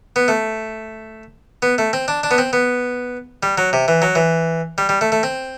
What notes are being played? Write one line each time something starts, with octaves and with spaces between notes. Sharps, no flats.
B3
A3
B3
A3
C4
D4
D4
B3
C4
B3
G3
F#3
C3
E3
F#3
E3
G3
G3
A3
A3
C4